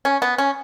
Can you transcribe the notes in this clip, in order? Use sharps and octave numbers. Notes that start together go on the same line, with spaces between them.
C#4
B3
C#4